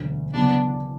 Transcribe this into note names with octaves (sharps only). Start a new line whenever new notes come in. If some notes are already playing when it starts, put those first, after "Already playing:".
Already playing: E1 D2 D3 F#3
F#1 E2 C#3 F#3 B3 D4